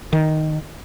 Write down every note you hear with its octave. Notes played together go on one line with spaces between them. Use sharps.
D#3